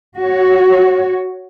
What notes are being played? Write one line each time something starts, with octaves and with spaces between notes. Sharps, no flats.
F#4 C#5